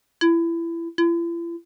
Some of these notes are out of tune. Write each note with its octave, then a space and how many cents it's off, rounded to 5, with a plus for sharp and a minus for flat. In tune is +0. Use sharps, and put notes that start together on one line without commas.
E4 +25
E4 +45